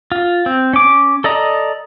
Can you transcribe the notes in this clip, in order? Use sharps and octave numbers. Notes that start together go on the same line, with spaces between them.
F4
C4
C#4 D6
A4 D5 D#5 A#5